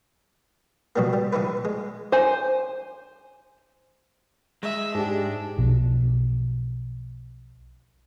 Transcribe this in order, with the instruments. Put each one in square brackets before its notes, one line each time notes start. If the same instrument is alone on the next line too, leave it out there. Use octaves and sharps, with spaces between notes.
[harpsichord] A#1 B2 F#3 G3 A#3
G3
A#1 E3 D#4 E4 B4
G#3
[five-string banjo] C5 G#5
[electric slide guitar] G#3 [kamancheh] E5
[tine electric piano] G#2 [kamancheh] D4 [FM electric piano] G4 G#4
[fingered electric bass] B1 B2 F3